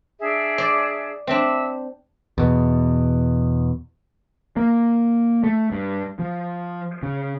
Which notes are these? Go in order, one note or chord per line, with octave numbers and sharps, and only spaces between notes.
D4 G#4 E5
D5
C4 D4 E5
E2 B2
A#3
A3
G2
F3
C#3